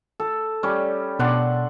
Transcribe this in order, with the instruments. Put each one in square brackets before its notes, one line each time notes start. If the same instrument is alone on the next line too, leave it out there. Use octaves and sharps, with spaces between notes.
[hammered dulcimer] A4
G3 C#4
[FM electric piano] B2 [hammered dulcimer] D4 F#5 C6